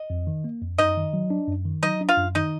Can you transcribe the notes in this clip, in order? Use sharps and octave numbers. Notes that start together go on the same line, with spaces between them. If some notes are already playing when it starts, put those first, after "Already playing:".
Already playing: D#5
F2
D#3
A#3
F2
F#2 D#4 D#5
D#3
F#3
D4
F#2
D#3
F#3 D#4 D#5
D4
F4 F5
F#2
D#3 D#4 D#5